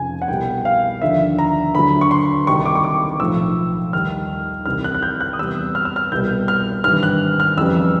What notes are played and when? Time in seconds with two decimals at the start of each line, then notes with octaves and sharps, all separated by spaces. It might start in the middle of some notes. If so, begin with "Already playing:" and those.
Already playing: F1 F2 C#3 F3 G#5
0.22 F#5
0.28 C2 B2 G3 G5
0.65 F5
1.01 D#2 D3 F3 E5
1.39 A#5
1.74 D2 D3 F#3 B5
2.01 C#6
2.11 C6
2.47 C2 C3 D#3 G3 C#6
2.66 D6
2.75 C#6
2.84 D6
3.20 B1 A2 F3 E6
3.92 D#2 D#3 G3 F6
4.65 C2 C3 E3 G3 F6
4.84 F#6
4.95 F#6
5.03 G6
5.20 F#6
5.33 D#6
5.39 E2 C3 E3 G3 E6
5.75 F6
5.85 E6
5.96 F6
6.12 C2 B2 G3 G6
6.48 F6
6.84 G#1 G2 E3 G3 F6
7.03 F#6
7.40 F6
7.57 F2 C#3 E3 G3 E6